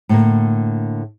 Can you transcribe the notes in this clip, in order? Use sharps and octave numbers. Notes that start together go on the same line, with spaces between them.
A2 D3 A#3